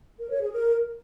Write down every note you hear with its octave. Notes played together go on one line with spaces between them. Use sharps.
A#4
C#5
G#4
A#4